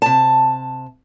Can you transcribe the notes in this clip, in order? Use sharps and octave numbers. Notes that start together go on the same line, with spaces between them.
C3 A5